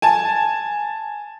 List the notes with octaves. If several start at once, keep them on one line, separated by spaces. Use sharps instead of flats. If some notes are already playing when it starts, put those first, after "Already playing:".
G#5 A5